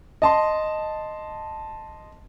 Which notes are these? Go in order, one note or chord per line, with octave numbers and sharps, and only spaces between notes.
D#5 A5 C6